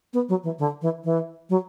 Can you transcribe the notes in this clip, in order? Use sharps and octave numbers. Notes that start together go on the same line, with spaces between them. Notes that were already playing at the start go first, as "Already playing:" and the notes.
B3
F#3
E3
D3
E3
E3
F#3